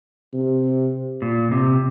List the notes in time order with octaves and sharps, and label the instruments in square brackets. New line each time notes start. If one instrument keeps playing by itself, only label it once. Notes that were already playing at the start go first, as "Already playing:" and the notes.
[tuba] C3
[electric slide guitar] A#2
C3